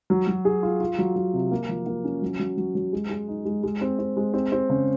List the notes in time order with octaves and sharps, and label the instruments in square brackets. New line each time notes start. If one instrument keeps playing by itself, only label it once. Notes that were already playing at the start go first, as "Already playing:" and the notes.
[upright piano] F#3
F#3
G#4
F4
F4
F#3
F#3
C3
A#3
F3
A#3
C#4
F#3
F#3
F#3
F#3
G#3
G#3
D#4
G#3
G#3
C4
C4
G#3
C4
C4
C#3